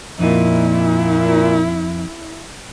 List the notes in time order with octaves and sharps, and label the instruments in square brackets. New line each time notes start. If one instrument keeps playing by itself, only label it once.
[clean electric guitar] F2 D#4 [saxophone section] A#2 [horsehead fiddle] E4